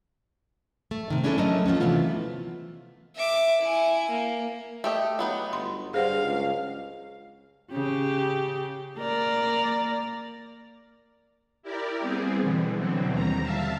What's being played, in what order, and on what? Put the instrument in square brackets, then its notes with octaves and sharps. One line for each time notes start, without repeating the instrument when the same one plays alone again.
[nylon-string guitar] A3
C3 D#3
G#3 C#4 D4 E4 G#4 A4
F#3 A3 C#4 A#4 D#5
F3 A3 B3 C#4
C3 E3 A3 B3 F4
[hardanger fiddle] E5 D6
E4 G#5
A#3
[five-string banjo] A3 G4 D#5
F#3 B3 D#4
[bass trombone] G1 [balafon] C6
[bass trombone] G2 [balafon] G#4 C5 F#5 [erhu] F5
[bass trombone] C#2
[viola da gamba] C#3 G4
A#3 A#4 D5
[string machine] E4 G4 A#4 D5
G3 B3 C4 G#4
B2 D3 E3
B2 D3 E3 F#3 C4
D#2 G3 A#5
E5 F5 A5